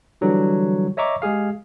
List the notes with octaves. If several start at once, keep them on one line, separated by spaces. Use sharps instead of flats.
D3 E3 F#3 G3
C#5 D#5 E5 A#5 C#6 D6
G#3 G4 G#4 F5